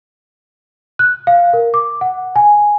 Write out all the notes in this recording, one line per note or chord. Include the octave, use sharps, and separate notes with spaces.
F#6
F5
A#4
D6
F#5
G#5